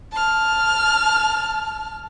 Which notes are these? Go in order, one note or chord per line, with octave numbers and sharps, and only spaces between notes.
A5 F6